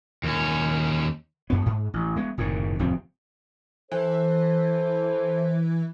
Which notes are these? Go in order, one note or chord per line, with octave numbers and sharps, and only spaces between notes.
D#2 C#4
F#2 B3
G#2
A1
G#3 B3
F#1 A2 C3 D#3
D1 F2 C3 C4
E3 A4 C5